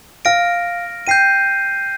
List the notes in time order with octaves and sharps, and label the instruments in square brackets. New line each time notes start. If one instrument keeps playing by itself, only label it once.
[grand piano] F5 [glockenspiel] F6 A#6 D7
[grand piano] G5 [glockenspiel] G6 C7 D#7